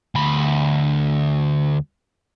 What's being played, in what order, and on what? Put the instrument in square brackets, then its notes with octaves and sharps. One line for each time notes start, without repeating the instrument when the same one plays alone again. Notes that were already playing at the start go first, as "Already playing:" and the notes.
[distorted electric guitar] D2 B5